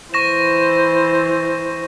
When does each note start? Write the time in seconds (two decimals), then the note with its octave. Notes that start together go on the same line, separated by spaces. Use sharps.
0.14 E3 C5 C#6 A#6 E7